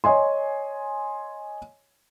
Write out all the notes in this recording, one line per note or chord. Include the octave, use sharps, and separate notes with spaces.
C#5 D#5 G#5 C6